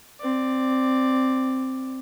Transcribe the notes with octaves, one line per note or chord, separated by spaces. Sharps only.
C4 D5